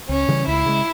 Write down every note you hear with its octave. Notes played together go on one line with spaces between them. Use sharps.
C#2 C#4
C#3 E3 G3
C#2 E4
C#3 G#3